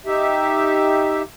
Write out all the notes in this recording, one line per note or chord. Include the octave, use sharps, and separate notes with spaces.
D#4 G4 E5